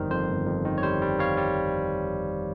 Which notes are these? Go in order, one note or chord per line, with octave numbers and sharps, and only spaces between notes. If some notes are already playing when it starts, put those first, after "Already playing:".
Already playing: G1 F2 D#3 G3 A#4 C5
F2 C5
G1
F2
D#3
C#5
G3 C5
G3
G3 C#5 F5
G3